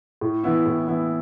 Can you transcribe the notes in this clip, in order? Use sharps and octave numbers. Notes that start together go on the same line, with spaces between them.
A2
E3 B3 E4
A2
E3 B3 E4